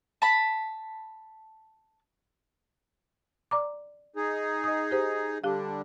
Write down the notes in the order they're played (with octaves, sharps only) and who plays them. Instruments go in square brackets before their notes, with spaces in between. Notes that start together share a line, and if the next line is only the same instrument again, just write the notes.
[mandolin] A5 B5
[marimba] D5 A#5 D6
[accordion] D#4 G#4
[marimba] D#5 D#6
G4 C5
[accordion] D3 G3 D4 [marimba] G4 F5